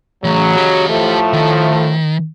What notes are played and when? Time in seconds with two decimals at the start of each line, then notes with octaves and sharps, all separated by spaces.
0.24 C#3 E3 F#3 A3
0.57 G4 D#5
0.90 A2 F3 A3
1.33 D#3